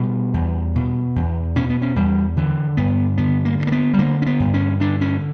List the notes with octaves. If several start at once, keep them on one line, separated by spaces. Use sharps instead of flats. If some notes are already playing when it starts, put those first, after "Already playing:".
Already playing: B2 G3
E2
B2
E2
B2 C#4
B3
C#4
E2 G3
D3 E3
G2 B3
D3 B3
A#3
G2
A#3
B3
G3
D3 A#3
C#4
B3
G2
C#4
D3 D4
C#4